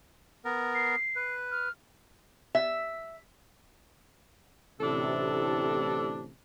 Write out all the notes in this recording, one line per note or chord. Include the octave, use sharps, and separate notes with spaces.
B3 A#4
C7
B4
F6
E5
A1 D2 A2 C3 D4 A4